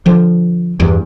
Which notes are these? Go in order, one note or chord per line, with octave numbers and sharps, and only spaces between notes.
D3 F3
E2 G2